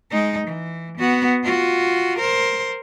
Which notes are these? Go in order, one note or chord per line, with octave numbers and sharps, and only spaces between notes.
G#3 D#4
E3
B3 F#4
F4 F#4
A#4 C5